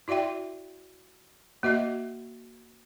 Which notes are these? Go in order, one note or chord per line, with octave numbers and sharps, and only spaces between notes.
E4 F#4 D5 E5 G5
A#3 F#4 D#5 E5